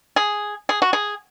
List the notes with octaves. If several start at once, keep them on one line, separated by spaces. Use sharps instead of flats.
G#4
G#4
F#4
G#4